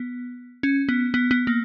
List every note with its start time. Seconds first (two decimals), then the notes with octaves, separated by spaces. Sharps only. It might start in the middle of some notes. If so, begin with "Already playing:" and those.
Already playing: B3
0.63 C#4
0.89 B3
1.14 B3
1.31 B3
1.47 A#3